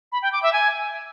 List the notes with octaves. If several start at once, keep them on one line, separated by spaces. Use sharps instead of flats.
B5
G5
D6
E5
G#5